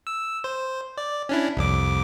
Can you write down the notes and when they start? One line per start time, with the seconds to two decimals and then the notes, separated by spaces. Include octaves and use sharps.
0.07 E6
0.44 C5
0.98 D5
1.29 C#4 D4 E4
1.57 C2 F2 D6